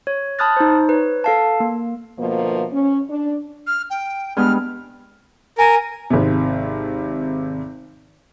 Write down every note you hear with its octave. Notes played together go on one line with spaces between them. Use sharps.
C#5
A5 B5 D#6 F6 F#6 A6
D#4 C5
B4 C#5
A4 F5 A5
A#3
D2 B2 F3 A#3
C#4
D4
F6
G5
G2 G#3 B3 F6
A#4 G#5
G#1 C3